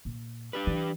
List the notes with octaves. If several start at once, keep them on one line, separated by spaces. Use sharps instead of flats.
A#2
D4 G4 B4
E3